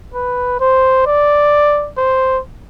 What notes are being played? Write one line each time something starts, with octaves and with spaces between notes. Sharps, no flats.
B4
C5
D5
C5